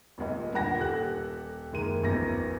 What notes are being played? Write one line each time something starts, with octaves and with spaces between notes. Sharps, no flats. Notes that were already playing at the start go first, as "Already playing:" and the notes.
D#1 C#2 D#5
G2 A#2 D3 F#5 G#5 A#6
D#1 G4 A4 F#6
F#1 D#3 G#3 A#3 D#7
A1 E2 F3 D#4 A#4 A#6